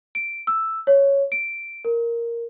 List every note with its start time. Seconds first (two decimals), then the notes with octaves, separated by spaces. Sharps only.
0.15 D7
0.47 E6
0.87 C#5
1.32 D7
1.85 A#4